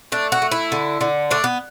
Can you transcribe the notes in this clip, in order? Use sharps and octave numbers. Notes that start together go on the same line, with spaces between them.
A3 D4
F#4
A3
E4
D3
D3
A3 D4
B3